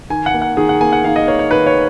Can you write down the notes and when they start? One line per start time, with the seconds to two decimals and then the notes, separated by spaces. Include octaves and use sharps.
0.10 D#3 G#5
0.26 F#5
0.34 A#3
0.42 F#5
0.57 D#3 G#4
0.69 F#5
0.81 A#3 G#5
0.93 F#5
1.04 D#3 F5
1.16 D#5
1.28 A#3 C#5
1.39 C#5
1.51 D#3 B4
1.66 C#5